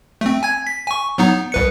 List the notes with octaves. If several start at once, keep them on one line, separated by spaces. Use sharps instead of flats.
A3 C4
G#5 G#6
B6
G#5 C#6
F#3 B3 D#4
C2 B4 C#7